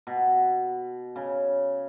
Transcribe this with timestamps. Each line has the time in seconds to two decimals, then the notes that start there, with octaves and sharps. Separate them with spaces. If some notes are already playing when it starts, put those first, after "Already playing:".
0.07 B2
1.16 C#3